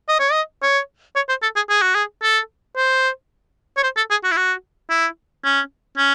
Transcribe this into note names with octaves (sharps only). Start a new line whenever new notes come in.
D#5
C#5
D#5
C#5
C#5
C5
A4
G#4
G#4
F#4
G#4
A4
C5
C#5
C5
A4
G#4
F#4
E4
F#4
E4
C#4
C#4